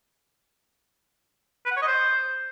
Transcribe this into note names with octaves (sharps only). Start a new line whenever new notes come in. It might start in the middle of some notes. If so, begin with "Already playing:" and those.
B4
F#5
C#5
D#5
C5